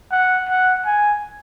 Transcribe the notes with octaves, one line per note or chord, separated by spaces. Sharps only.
F#5
F#5
G#5